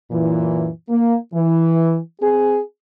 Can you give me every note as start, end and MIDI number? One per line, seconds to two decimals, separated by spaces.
0.11 0.68 42
0.11 0.68 46
0.11 0.68 52
0.88 1.15 58
1.33 1.97 52
2.21 2.58 60
2.21 2.58 68